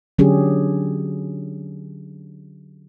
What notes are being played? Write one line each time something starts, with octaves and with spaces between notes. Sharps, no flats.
D3 F#3 C#4 D4 G4 G#4